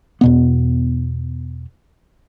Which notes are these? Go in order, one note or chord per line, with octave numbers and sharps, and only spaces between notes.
E2 B2 B3